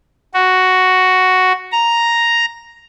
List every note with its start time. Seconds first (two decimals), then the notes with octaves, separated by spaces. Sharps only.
0.34 F#4
1.72 A#5